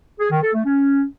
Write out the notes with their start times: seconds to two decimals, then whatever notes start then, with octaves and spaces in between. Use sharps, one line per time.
0.20 G#4
0.31 D#3
0.43 A4
0.54 A3
0.65 C#4